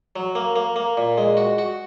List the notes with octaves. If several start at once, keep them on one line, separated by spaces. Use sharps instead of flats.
F#3
A#3
A#3
A#3
A#2
G#3
F#4
F#4